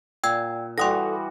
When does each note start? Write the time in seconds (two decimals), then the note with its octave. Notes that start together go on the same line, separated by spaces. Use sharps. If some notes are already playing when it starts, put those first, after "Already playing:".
0.24 A#2 G5 E6 G#6
0.78 E3 G3 F#4 A4 F#5 C6 D#6 A#6